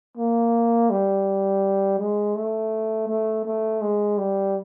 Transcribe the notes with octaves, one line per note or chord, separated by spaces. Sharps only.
A#3
G3
G#3
A3
A3
A3
G#3
G3